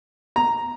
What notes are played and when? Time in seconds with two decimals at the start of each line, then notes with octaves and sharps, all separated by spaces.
0.36 A#5